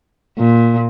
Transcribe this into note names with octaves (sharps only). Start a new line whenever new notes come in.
A#2